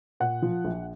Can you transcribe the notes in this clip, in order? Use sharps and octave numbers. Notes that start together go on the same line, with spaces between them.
A#2 F#5
F3
A#1